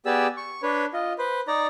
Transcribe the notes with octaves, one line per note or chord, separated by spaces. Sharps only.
B3 G4 G#4 D5 E6
C#6
D4 B4 C#5
F4 D#5
B4 C5
D#4 D5 A#5